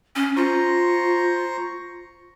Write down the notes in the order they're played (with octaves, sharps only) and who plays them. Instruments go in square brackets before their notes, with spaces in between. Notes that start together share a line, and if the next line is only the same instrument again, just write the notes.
[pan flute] C#4
[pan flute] F4 [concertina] C5 A#5 C#6